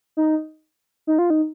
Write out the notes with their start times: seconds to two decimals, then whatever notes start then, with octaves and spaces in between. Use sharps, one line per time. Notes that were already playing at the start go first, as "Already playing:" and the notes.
0.17 D#4
1.07 D#4
1.19 F4
1.30 D#4